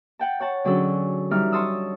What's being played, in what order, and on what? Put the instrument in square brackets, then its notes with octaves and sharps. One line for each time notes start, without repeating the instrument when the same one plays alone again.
[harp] F#5 G5 A5
C#5 F#5 A5
D3 F#3 C#4 D4 G#4 A4
E3 G3 D#4 F6
C#5 A5 C6 D#6 E6